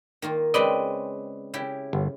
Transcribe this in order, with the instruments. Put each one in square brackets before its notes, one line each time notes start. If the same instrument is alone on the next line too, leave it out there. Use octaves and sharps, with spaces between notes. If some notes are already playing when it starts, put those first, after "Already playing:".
[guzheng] D#3 A#3 F4
[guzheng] C#3 G#3 C4 [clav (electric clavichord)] B4 D5 D#5
[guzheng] C#3 E4 G4
[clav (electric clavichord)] G1